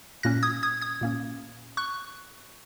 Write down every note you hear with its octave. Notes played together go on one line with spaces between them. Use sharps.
A#2 A#3 C#4 F#6 A#6
D#6 G#6
D#6 G#6
D#6 G#6
A#2 A#3 C#4
C#6 F#6